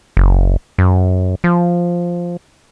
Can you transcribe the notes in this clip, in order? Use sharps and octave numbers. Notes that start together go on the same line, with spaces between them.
F#1
F#2
F3